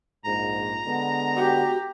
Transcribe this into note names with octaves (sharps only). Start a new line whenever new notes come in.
A#1 G#2 A#5
D3 G#3 B3
F#4 G4